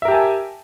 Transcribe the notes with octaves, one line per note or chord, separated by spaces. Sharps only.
G4 A#4 E5 G#5 A5